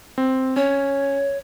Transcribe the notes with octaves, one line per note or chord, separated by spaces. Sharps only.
C4
C#4 C#5